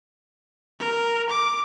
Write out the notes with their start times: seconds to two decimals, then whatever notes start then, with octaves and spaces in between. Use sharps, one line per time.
0.80 A#4
1.29 D6